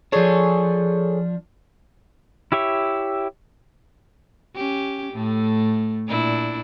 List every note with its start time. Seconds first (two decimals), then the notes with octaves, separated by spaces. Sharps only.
0.12 F3 D4 G#4 A4 C#5
2.52 E4 G4 C#5 E5
4.56 C#4 G4
5.14 A2 A3
6.08 A#2 D4 E4